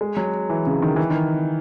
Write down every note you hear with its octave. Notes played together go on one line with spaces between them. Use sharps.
G#3
F#3
E3
C#3
D#3
E3
D#3